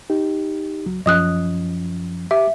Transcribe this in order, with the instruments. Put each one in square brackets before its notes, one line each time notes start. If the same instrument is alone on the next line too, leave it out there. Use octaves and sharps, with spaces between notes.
[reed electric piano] D#4 G4
C#2 F#3
[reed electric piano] F#2 F3 C#4 [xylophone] D#5 D#6 F#6
[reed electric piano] G4 D6 [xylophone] E5